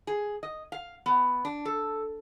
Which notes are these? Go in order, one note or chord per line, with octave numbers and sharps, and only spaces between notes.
G#4
D#5
F5
B3
D4
A4